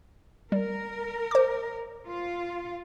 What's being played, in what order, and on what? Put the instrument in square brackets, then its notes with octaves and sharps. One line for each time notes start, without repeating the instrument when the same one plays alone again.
[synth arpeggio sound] G3 [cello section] A#4
[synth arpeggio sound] C5 D6
[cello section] F4